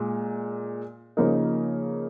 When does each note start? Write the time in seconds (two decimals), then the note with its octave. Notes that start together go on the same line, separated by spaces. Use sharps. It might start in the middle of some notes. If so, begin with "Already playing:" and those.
Already playing: A#2 G#3
1.17 C#3 F3 A#3 D#4 A#4